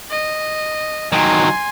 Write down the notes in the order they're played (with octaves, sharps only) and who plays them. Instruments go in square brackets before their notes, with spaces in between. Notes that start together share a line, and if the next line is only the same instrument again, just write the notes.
[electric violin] D#5
[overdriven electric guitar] D#3 F#3 [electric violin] G#5 C6